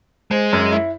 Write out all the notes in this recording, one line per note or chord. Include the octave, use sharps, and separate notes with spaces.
G#3 C5
F#2
E4